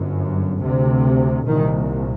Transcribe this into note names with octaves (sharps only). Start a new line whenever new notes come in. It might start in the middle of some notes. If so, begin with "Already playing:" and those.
Already playing: G1 F#2
D2 C3
C2 A#2 D#3